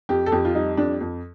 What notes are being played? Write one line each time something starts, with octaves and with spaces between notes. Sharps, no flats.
F2 G4
A4
F2 G4
F4
G3 D#4
F2 D4
F2